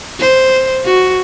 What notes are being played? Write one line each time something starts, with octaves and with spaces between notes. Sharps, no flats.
C5
F#4